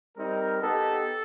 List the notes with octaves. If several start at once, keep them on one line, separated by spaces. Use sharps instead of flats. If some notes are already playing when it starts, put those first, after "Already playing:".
G3 C4 D#4 A#4
B3 D#4 G4 A4